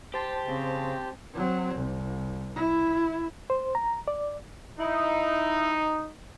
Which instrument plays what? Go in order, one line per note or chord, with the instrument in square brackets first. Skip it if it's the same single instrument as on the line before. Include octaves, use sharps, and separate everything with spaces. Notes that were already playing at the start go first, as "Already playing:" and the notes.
[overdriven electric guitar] G4 [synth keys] C5 A5
[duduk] C#3 [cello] C4
[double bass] F#3 C4
C2
E4
[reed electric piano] C5
A#5
D5
[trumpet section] D#4 [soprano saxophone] E4